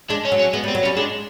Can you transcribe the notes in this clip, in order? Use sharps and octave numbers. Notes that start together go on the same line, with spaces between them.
G#3 D4
C#4
F#3
C#4
G#3 B3
G3 C4
F#3
G3 C#4
G#3 D4